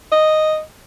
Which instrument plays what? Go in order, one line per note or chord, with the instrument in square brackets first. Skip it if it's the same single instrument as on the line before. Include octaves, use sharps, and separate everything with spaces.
[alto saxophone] D#5